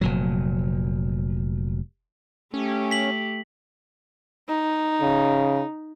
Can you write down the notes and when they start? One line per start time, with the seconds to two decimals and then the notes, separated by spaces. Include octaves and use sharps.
0.01 F1 A#2 F#3
2.54 A3 C#4 G4
2.91 B6 F#7
4.48 D#4
5.02 C#3